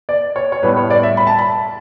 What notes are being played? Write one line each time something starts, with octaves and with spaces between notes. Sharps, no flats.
D5
C#5
C#5
A2 G3 B3 B4
C#5
D5
E5
B5
A5
B5